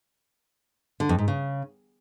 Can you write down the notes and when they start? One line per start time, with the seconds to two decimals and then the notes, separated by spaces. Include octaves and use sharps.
1.00 D3
1.09 F2
1.18 G#2
1.28 C#3